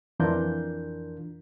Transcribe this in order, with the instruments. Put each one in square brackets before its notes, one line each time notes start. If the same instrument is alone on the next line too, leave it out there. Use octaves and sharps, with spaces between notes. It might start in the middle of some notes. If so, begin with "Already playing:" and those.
[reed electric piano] F2 E3 D4 F4 A#4 G6